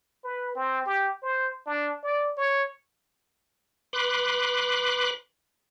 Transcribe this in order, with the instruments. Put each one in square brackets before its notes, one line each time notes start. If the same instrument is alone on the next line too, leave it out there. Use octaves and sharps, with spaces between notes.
[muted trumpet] B4
C4
G4
C5
D4
D5
C#5
[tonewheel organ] B4 B5 C6 D6 F#6